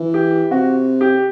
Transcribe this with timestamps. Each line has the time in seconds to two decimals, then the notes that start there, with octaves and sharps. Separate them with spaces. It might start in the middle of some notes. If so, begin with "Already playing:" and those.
Already playing: E3
0.14 G4
0.51 C3 F#4
1.01 G4